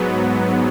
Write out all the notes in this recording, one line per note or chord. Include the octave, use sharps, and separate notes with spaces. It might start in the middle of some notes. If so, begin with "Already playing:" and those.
Already playing: G#2 F#3 B3